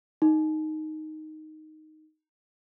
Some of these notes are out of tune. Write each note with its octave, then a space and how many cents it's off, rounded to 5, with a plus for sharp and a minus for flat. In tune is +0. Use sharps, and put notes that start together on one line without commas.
D#4 +0